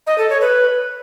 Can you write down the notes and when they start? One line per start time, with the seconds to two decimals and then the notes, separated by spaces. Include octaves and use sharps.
0.07 D#5
0.18 A4
0.30 C#5
0.41 B4